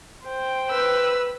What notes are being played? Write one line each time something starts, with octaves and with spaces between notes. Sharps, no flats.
C5 G5
B4 E6